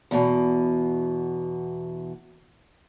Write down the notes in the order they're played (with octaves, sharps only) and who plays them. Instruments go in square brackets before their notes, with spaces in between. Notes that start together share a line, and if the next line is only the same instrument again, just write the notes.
[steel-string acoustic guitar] E2 B2